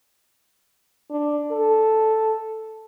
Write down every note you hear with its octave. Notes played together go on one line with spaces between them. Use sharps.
D4
A4